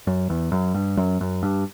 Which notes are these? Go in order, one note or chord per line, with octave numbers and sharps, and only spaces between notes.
F#2
E2
F#2
G2
F#2
F#2
G2